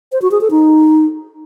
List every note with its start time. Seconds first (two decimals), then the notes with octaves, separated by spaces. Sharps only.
0.12 C5
0.22 F#4
0.31 G#4
0.41 A4
0.51 D#4